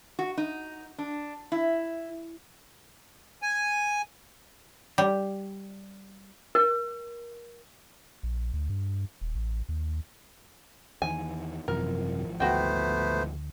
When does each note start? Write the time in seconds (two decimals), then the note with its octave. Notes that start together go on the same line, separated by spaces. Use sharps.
0.19 F#4
0.37 D#4
0.98 D4
1.52 E4
3.42 G#5
4.98 G3
6.55 A#4
8.23 A#1
8.54 D2
8.70 G2
9.21 D#1
9.35 A1
9.69 D#2
11.02 E2 D#3 E3 G#5
11.68 G#1 F#2 C3 E3 F3 A#4
12.40 D2 A3 B3 F#4 C5 G5